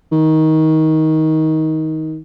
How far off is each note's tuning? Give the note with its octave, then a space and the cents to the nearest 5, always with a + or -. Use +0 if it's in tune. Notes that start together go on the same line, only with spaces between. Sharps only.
D#3 +20